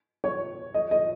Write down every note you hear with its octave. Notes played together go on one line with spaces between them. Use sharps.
C#5
D#5
D#5